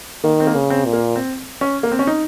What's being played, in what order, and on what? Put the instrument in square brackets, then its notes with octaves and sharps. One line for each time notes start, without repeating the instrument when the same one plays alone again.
[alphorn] D#3 [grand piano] A#3
[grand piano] C4
A#3
[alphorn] C#3
[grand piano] C4
[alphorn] A#2
[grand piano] A#3
C4
C#4
A#3
C4
C#4
D#4